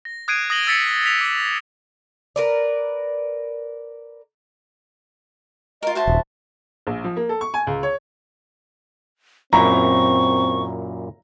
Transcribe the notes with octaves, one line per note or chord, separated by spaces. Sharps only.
A#6
D#6 F#6 G#6 C7 D7 D#7
D#6 A#6 F#7 G7
E6 G#6 A6 B6 C#7
B6 F7 G7
D6 B6
A#4 B4 D5
F4 A#4 D#5
F#4 C5 E5 A5
D#1
A#1
F3
A#3
A4
C#6
G#5
C#2
C#5
F#2 A#2 C4 E4 A#5 C#6